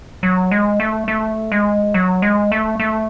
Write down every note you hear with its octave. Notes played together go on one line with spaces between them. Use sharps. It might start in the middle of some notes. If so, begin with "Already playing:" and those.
F#3
G#3
A3
A3
G#3
F#3
G#3
A3
A3